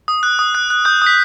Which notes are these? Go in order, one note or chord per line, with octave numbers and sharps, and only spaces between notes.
D#6
F#6
D#6
F#6
F#6
D#6 G6
D#6 B6